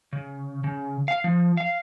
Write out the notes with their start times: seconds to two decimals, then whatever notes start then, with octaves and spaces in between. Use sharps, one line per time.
0.13 C#3
0.64 C#3
1.08 F5
1.24 F3
1.57 F5